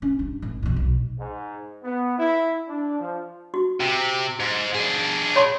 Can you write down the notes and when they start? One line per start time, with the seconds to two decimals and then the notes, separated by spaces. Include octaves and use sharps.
0.02 C#4
0.19 G2
0.42 G#1
0.62 F2 B2
0.76 B1
1.19 G#2
1.84 B3
2.18 E4
2.69 D4
2.99 F3
3.54 F#4
3.80 C3
4.40 G#2
4.74 D4 G#4
5.36 C#5 B5 C6